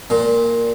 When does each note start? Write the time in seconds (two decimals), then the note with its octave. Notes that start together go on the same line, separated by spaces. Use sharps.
0.10 A#2